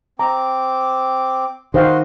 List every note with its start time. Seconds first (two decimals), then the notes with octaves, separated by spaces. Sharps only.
0.19 C4 A#5 D6
1.74 D#3 F#4 G4 C5 D#5 F5 C6